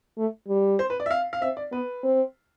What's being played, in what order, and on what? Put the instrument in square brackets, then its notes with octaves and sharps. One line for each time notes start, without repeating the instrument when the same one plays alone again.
[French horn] A3
G3
[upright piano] C5
B4
D5
E5
F5
F5
[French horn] C4 [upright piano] E5
[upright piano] D5
[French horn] B3 [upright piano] B4
[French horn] C4